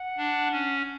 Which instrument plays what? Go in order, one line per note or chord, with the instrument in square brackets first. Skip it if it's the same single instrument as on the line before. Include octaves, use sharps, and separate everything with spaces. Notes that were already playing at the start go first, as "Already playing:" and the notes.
Already playing: [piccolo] F#5
[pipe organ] D4
C#4